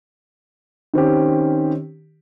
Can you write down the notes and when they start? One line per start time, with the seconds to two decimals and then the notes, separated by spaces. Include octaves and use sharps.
0.94 D#3 C4 C#4 G4